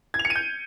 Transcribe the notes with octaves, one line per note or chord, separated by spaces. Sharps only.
G#6
F7
C#7
D#7
G6